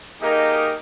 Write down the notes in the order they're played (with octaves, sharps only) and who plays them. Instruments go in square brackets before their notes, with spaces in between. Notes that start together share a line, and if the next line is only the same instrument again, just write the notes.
[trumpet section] A#3 D#4 G4 G#4 A#4 D#5